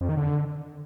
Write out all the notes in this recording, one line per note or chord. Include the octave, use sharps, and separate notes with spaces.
F2
D#3
D3